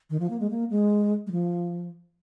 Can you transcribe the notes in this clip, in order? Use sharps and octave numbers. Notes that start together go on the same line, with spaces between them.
D#3
F3
A#3
G#3
A#3
G#3
G#3
F3